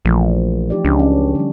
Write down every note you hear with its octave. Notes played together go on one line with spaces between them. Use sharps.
A#1 E3 F3 A3
D#4 G4 D5
C#2 C#4 D4
C#4
D3 G3